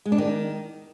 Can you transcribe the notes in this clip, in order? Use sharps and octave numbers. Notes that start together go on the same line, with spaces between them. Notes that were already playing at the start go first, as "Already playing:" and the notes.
G#3
D4
D#3